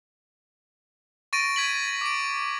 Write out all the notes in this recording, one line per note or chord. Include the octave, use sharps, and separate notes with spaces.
C#6 A6 A#6 D7 D#7
G#6 B6 F#7
D6 D7